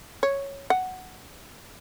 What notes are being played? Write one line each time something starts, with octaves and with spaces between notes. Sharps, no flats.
C#5
F#5